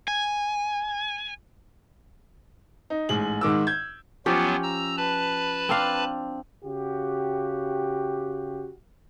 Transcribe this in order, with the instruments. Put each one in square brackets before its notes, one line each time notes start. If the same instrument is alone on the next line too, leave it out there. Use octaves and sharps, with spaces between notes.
[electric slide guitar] G#5
[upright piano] D#4
A1 G#2 G#4 F#7
G#2 D#3 D6 E6
G6 G#6
[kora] F3 C#4 G4 [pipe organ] F#3 B3 F4
[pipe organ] A#5 E6
B4 A5 B5
[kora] C4 D4 F5
[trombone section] C#3 F#4 G4